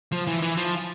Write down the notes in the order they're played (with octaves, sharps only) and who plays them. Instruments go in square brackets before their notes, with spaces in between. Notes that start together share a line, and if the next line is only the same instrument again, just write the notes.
[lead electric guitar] F3
E3
E3
F3